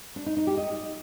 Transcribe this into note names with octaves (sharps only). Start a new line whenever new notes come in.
D4
D#4
D#4
G4
D#5